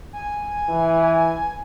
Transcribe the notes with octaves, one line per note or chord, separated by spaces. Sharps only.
G#5
E3